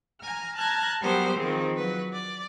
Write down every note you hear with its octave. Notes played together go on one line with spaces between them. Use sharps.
G#5 A#5 F6
A5 A#5 F6 F#6 G#6
F#3 G3 B3 G4 A#4 C5
D#3 F3 C4 G#4
F#3 B4
D5